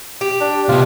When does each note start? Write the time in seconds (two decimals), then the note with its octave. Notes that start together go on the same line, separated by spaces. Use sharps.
0.21 G4
0.41 D4
0.69 C3 B3 F4